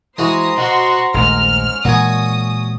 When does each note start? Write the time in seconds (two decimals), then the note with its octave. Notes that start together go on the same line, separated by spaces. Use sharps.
0.18 E3 G#3 F#4 C5 A#5 D#6
0.57 B2 F#4 C6
1.14 A#1 D#2 G#2 A3 F6
1.44 C#4
1.85 A#2 E3 G#3 F#4 G#5 D#6